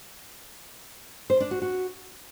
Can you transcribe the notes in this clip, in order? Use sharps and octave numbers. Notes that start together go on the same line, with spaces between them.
C5
D4
F#4
F#4